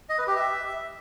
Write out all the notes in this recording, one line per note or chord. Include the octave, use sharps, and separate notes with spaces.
D#5
B4
G4
E5